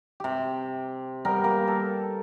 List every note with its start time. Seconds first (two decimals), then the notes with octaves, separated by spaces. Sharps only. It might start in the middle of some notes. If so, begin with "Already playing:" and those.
0.20 C3 G4
1.25 G3 B3 A#4 G5
1.44 A#3 A#4
1.68 A4